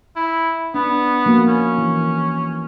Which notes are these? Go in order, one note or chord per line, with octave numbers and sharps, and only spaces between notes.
E4
B3 D4
F3 A#3 F#4
C#4
E3